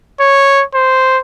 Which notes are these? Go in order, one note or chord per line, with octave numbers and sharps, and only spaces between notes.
C#5
C5